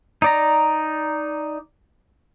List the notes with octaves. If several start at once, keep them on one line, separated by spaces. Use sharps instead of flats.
D#4 D5 A#5